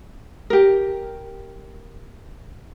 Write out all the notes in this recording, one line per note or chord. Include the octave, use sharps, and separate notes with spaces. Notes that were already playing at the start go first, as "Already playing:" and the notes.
G4 A#4